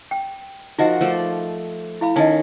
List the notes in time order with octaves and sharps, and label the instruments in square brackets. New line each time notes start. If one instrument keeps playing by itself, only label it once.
[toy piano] G5
[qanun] F3 F#4 A#4 [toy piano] D#4 D#5 F#5
[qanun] F3 A3 D5
[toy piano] E4 F5 B5
[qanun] D#3 C#4 [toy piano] D#5 G#5 A5